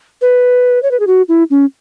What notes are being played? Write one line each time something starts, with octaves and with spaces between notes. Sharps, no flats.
B4
C#5
B4
G#4
F#4
E4
C#4